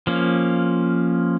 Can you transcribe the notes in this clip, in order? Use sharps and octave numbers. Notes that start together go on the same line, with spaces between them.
F3 A#3 C#4